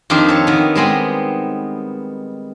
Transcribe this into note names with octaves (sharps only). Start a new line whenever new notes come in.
F2 D#3 D4 D#4 G4 C5
A4 C#5
D#3 B3
G3 G#3 B3 C4